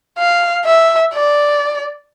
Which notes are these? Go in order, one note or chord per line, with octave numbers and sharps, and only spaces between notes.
F5
E5
D5